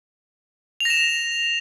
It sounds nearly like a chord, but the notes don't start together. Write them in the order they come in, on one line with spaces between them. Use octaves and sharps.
F7 A#6 E7